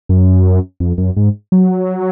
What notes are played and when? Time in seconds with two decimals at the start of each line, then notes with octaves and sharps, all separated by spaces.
0.09 F#2
0.80 F2
0.98 F#2
1.16 G#2
1.52 F#3